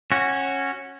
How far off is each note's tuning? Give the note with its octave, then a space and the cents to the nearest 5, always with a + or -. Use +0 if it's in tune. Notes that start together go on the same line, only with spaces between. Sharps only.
C#4 -15 F#4 +0